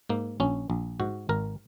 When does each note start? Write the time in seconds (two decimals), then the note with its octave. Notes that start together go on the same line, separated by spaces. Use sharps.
0.09 G#2 A#3
0.40 A#1 C#4
0.70 A#1
1.00 G#2 F#4
1.29 G#1 A#4